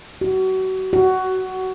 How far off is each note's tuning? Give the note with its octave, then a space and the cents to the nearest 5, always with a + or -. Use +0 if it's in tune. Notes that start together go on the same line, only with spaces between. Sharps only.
F#4 +30
F#4 +15